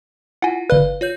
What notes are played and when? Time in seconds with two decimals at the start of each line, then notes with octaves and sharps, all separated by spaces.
0.42 E4 F4 F#5 G#5
0.70 G1 B4 D5 F5
1.01 F4 C#5 G6